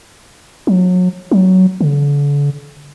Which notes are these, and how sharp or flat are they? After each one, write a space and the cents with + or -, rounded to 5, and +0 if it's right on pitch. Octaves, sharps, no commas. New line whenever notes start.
F#3 -30
F#3 +10
D3 -40